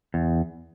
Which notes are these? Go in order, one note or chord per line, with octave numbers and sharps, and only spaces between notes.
E2